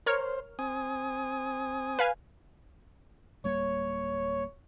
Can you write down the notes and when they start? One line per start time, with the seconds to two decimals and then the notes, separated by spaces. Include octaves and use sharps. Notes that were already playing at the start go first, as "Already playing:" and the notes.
0.06 A#4 C5 C#5 F6
0.59 C4 G#5 D#6
1.99 B4 F5 G#5
3.44 D1 G3 A#3 C#5